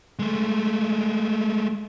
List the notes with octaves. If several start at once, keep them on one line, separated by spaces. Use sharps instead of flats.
G#3 A3